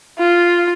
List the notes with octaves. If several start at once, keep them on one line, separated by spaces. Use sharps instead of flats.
F4